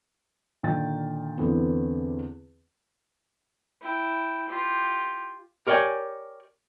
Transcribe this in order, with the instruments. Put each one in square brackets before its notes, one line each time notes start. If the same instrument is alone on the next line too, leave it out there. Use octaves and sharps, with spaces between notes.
[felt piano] A#2 D3 D#3 G5 A6
E2 D3 B3 C4
[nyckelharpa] E4 G5
F4 G4
[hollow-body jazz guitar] G4 A#4 C#5 D5 G5 G#5